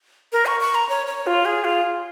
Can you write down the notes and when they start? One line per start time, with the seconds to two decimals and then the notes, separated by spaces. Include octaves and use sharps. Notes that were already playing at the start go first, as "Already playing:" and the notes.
0.32 A#4
0.46 C#6
0.60 C#6
0.75 A#5
0.89 C#5
1.07 C#5
1.27 F4
1.45 G#4
1.64 F4